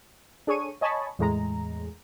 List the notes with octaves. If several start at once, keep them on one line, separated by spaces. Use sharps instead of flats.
D4 G#4 A4 C#5 C#6 D#7
C#5 D#5 G#5 A5 B5 C#6
E2 A2 G#3 A#5